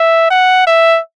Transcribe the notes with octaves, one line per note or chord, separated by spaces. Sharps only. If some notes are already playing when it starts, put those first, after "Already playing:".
Already playing: E5
F#5
E5